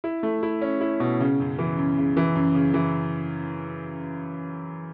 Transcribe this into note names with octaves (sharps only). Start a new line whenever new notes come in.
E4
A3
E4
C#4
E4
B2
C#3
F#2
E3
F#2
C#3
E3
F#2
C#3
E3